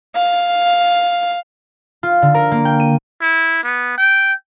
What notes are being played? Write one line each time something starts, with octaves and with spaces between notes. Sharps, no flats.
F5
F4
D3
A#4
A#3
G5
D#7
E4
B3
G5